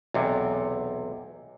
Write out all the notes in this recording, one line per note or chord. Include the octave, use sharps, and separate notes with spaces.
B1 E2 C3